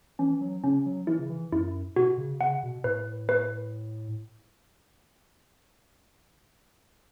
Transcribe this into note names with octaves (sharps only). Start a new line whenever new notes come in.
E3 C#4
F#3
C#3 C#4
F#3
E3 E4
C#3
E3
F#2 E4
B2 F#4
C#3
C#3 F#5
B2
A2 B4
B4